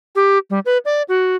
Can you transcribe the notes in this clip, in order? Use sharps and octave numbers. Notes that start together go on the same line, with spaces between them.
G4
G3
B4
D5
F#4